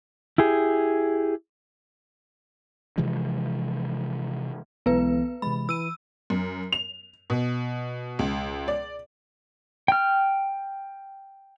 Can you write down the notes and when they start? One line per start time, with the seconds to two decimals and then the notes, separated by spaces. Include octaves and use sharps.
0.38 E4 G4 G#4
2.98 C3 E3 F3 G#3
4.86 B1 E3 G#3 B3 B4
5.42 C3 E3 G#3 B5
5.69 E3 E6 D#7
6.30 F#2
6.73 F7
7.30 B2
8.19 C#2
8.68 D5
9.88 G5 F6